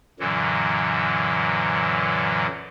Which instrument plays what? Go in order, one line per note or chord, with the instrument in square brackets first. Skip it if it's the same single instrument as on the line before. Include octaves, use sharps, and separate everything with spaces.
[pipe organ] F#2 A#2 D3 E3 F#3